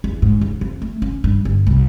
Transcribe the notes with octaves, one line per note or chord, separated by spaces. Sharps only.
E2
G#2
D#2
F2
A3
C#4
G2
G1
C2